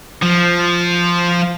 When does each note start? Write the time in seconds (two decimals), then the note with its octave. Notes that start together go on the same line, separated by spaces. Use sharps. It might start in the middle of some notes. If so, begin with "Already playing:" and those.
0.22 F3